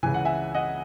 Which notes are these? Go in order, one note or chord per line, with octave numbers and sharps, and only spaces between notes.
C#2 C#3 E3 G#5
F#5
E5 G#5
D#5 F#5